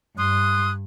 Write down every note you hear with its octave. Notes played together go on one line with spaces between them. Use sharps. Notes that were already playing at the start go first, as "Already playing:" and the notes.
G2 C6 D#6 F#6